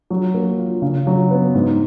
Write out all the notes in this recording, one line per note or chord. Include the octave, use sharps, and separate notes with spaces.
F#3
A#3
F4
C#3
F#3
B3
G#2